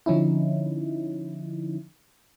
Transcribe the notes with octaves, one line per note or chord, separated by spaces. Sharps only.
D3 F3 C#4 D#4 E4